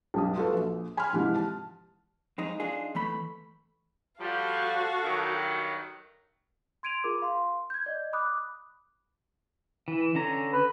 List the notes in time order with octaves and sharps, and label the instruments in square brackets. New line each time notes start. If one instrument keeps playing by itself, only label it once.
[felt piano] B1 G2 D#6
F4 F#4 A4 B4
A#1
G#5 B5 C6 F6
G#2 C3 E3 F3
A5
[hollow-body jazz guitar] F2 G#3 D#4
D4 D#4 F4 G#4
E3 A3 B5
[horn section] F3 G3 [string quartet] F#4 A4 F5
[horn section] G2 D#3 F#3
[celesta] C6 G#6 D7 D#7 F7
F4 G#4 A#4 D6
F5 C6
G6 G#6
D5 D#5
B5 D6 D#6 F#6
[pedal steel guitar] E3
D3 C#4 A#5
[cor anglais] B4